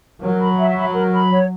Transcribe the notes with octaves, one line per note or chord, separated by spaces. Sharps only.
F#3 A#4
B5
E5
B5
A#4
B5
C#5